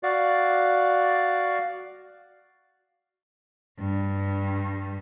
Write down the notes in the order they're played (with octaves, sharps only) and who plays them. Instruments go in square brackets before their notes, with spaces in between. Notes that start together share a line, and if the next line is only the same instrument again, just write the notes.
[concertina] F#4 D5 F5
[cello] G2